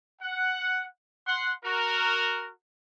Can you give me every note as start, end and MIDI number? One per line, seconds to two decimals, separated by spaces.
0.22 0.86 78
1.27 1.52 78
1.27 1.52 84
1.64 2.50 66
1.64 2.50 70